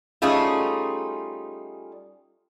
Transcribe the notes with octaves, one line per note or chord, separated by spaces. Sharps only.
G3 A3 C#4 D#4 F4 G#4